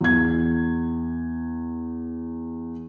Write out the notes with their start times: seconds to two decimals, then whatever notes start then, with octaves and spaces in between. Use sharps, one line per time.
0.01 E2 G#6